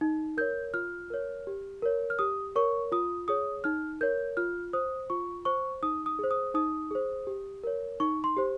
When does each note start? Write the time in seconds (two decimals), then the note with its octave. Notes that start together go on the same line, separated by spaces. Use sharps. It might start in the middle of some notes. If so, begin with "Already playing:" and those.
0.01 D#4
0.37 A#4 C#5 G6
0.74 F4 F6
1.10 A#4 C#5
1.47 G4
1.82 A#4 C#5
2.10 F6
2.19 G4 D#6
2.56 A#4 C#5 C#6
2.92 F4 D#6
3.28 G#4 C#5 D#6
3.64 D#4 F6
4.01 A#4 C#5 G6
4.37 F4 F6
4.73 C5 D#6
5.10 F4 C#6
5.45 C5 C#6
5.83 D#4 D#6
6.06 D#6
6.19 G#4 C5
6.31 D#6
6.54 D#4 D#6
6.91 G#4 C5
7.27 G4
7.64 A#4 C#5
8.00 D#4 C#6
8.24 C6
8.37 G4 C5